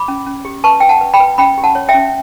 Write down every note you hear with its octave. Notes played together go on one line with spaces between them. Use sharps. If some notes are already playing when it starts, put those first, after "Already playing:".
Already playing: B5 D6
C#4
C#4
G4
B4 A5 C#6
B4 G5
F#5 A5
B4
G5 B5
B4
C#4 G5 B5
G4
F#5 A5
C#5
E5 G5
C#4